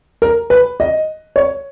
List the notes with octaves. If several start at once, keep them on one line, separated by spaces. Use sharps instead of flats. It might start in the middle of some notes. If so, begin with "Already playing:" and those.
A#4
B4
D#5
C#5